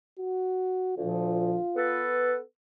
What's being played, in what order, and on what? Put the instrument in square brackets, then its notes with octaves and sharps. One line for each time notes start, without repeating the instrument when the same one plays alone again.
[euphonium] F#4
[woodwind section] D2 A#2 F3 [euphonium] F4
[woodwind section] B3 A4 B4